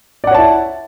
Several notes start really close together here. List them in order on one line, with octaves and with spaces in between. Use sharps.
D5 F#5 C#5 A5 E4